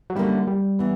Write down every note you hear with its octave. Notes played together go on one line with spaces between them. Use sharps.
F#3
D3 G3 A#3 C#4 E4
G3
E3 B3